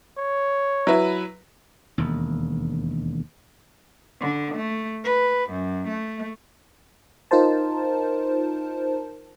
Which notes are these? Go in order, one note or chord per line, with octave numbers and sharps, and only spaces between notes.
C#5
F#3 E4 B4
E1 D#2
D3
A3
B4
F#2
A3
D#4 F4 A#4 C5 A5